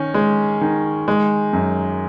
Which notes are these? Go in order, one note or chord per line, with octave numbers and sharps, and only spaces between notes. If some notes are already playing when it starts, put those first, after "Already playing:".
Already playing: D#3 C#4
G#3
D#3
G#3
F#2